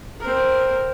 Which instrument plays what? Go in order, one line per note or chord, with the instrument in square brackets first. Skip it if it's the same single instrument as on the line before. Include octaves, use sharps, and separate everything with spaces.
[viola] C4 A#4